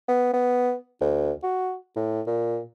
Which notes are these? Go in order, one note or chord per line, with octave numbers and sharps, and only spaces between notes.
B3
B3
D2
F#4
A2
A#2